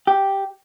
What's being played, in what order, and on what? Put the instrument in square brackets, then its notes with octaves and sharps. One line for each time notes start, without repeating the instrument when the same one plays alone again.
[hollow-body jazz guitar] G4